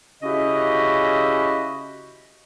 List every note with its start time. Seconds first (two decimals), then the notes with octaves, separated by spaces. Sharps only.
0.23 C#3 C#4 E4 F#4 G4 D#5